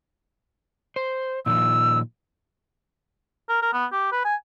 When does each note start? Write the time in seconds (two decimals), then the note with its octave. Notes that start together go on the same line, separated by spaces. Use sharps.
0.96 C5
1.46 A#2 D#3 F3 E6
3.49 A#4
3.62 A#4
3.73 B3
3.93 G4
4.12 B4
4.25 G#5